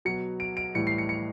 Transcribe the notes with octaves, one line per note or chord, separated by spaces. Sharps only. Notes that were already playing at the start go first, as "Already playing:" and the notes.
B2 F#3 B3 C#7
D7
D7
A2 E3 G3 C#7
C7
C#7
C#7